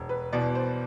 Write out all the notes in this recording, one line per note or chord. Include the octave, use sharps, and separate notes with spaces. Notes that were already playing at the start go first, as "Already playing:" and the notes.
Already playing: E1
B4
E2 B2 D5
C5